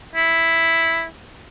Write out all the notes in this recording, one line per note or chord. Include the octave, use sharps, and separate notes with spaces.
E4